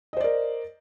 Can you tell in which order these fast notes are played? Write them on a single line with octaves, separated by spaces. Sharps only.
D#5 C5 D5 A#4